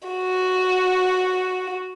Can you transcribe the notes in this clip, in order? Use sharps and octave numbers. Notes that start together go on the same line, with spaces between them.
F#4